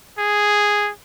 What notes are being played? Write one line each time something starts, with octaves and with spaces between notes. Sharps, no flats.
G#4